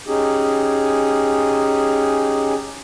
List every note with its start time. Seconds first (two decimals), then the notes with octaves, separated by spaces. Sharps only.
0.08 C#4 D#4 G4 G#4